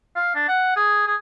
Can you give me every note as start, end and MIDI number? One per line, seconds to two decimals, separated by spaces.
0.16 0.32 77
0.35 0.43 62
0.48 0.73 78
0.76 1.03 68
1.07 1.15 68